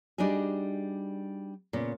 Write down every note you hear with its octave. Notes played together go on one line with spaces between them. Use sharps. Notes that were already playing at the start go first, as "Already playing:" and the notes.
G3 D4 D#4 F#4 G#4
A#2 C#3 B3